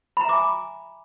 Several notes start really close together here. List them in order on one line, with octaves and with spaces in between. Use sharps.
B5 A#5 E5 D6 G#5